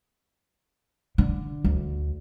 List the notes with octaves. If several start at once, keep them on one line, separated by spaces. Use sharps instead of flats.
D3
D2